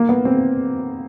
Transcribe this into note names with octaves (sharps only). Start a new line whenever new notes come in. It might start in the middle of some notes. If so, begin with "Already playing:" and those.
Already playing: A#3
B3
C4